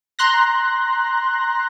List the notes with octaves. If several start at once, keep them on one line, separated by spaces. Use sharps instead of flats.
A#5 C6 F#6 A#6